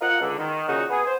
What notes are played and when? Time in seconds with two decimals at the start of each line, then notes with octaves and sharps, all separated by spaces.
0.01 F4 A#4 D#5 F5 F#5
0.20 C#2 D3
0.38 D#3
0.67 A#2 C#3 D#4 F#4
0.90 B3 G#4
1.06 C5